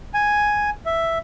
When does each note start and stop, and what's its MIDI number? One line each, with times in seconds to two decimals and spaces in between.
0.14 0.70 80
0.86 1.18 76